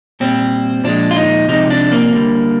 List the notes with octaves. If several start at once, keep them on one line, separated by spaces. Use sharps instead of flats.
A#2 G3 C4
A#2 F3 G#3 D4
F4
D#4
C3 F3 G#3 D#4
D4
A#3
D3 G3